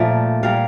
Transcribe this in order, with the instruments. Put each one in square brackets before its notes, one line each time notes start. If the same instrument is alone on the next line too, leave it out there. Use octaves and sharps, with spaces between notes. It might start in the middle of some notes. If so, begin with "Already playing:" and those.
Already playing: [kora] A#2 F3 A3 D5
A#2 G3 A#3 F5